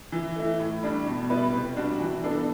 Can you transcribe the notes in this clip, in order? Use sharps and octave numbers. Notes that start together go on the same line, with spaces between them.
E3
A3 E4
A2
G3 D4
B2
G3 B3 E4 B4
C3
G3 D4 F#4
E3
B3 D4 A4